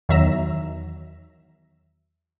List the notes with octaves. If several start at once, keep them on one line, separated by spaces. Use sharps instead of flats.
E2 D#3 F#3 E5 A#5 E7